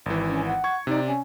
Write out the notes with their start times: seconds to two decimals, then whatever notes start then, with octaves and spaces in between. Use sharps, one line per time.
0.06 G#1 E3
0.28 C#4
0.46 F#5
0.64 C#6 G#6
0.87 C3 D#4 D5
1.07 C#4